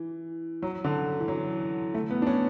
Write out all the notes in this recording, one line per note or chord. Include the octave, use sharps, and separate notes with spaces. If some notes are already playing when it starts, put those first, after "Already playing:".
Already playing: E3
F#3
D3
E3
F#3
A3
B3
D4
C#4